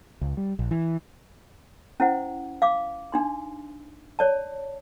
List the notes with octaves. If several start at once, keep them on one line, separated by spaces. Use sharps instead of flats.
C#2
G3
A#1
E3
C#4 E4 C5 F#5
F5 D6
D4 D#4 C6
C#5 D5 A5